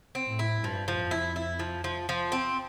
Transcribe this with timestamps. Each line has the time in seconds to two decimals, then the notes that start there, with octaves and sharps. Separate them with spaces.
0.15 C4
0.27 A2
0.39 E4
0.63 G2 F3
0.88 F3
1.00 F2
1.11 E4
1.36 E4
1.59 F3
1.84 F3
2.09 F3
2.32 C4